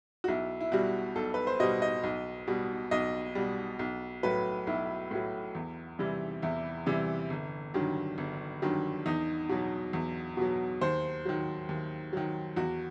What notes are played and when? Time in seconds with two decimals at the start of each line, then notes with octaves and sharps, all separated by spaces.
0.24 F#4
0.28 B1 E4
0.61 E4
0.72 B2 G3 F#4
1.16 B1 A4
1.34 B4
1.47 C5
1.60 B2 G3 D#5
1.82 D#5
2.04 B1
2.47 B2 G3
2.91 B1 D#5
3.35 B2 G3
3.79 B1
4.23 A2 F#3 B4
4.67 B1 E4
5.11 A2 F#3
5.55 E2
5.99 C3 E3 G3
6.42 E2 E4
6.86 C3 E3 G3
7.30 G1
7.74 G2 D#3 F#3
8.18 G1
8.62 G2 D#3 F#3
9.06 E2 D#4
9.49 B2 F#3
9.93 E2
10.37 B2 F#3
10.81 D#2 C5
11.25 D#3 F#3
11.69 D#2
12.13 D#3 F#3
12.56 E2 F#4